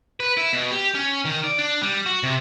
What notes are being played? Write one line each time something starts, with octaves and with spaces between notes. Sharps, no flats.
B4
E4
B2
G4
C#4
D#3
D5
D4
G3
F#4
C3